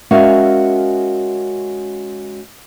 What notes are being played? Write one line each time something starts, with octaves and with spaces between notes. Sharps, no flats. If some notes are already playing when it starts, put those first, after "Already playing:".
G#3 C#4 F#4 A#4 E5 F5